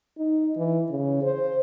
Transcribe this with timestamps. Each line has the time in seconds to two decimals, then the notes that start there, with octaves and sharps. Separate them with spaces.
0.18 D#4
0.56 E3
0.90 C#3
1.23 C5